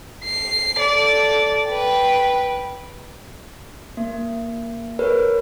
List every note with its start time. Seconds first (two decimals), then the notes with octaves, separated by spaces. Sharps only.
0.24 C7
0.76 A4 D5
1.68 B4 G5
3.97 A#3
4.99 A#4 B4 C#5